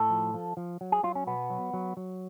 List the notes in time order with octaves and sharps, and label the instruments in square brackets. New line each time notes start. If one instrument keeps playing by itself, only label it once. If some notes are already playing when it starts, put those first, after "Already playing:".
Already playing: [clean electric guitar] A2 A4
F3
F3
F3
F#3
G#4
F#3 F4
C#4
B2 B3
F#3
F#3
F#3